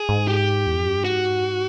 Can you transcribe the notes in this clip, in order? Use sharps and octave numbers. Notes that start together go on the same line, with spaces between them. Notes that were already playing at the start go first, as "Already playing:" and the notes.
Already playing: G#4
G#2
G4
E2
F2
F#2
G2
G#2 F#4